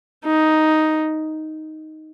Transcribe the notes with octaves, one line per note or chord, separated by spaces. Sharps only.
D#4